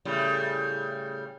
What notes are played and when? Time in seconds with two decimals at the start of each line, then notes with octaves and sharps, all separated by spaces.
0.05 A2 C#3 G3